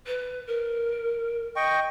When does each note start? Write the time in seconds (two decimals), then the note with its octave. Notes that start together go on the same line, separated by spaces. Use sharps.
0.07 B4
0.47 A#4
1.56 D#5 G5 C#6